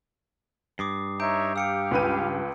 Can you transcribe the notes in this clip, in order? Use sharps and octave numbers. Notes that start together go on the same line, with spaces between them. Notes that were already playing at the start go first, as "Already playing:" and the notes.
G2 D6 D#6 C7
D#4 C#5 E5 A#5 G6 D7
G4 F5 E6 C#7 D7
C#2 B4 D#7